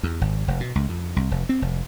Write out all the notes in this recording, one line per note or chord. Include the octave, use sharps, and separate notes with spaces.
E2
G#1
F1
B2
C#2
F2
C2
F1
C4
F1